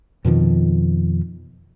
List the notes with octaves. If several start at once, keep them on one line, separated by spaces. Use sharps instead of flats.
F2 B2 D#3 F3